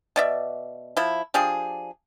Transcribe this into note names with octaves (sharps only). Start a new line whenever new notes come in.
B2 D5 E5
F3 E4
F3 D4 G4 G#4